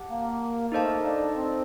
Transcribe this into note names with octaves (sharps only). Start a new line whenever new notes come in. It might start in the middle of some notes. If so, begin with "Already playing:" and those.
Already playing: G4 F#5 A5
A#3
A#3 D#4 A4 C5 D#5 A5
A3
A#3
D4
C4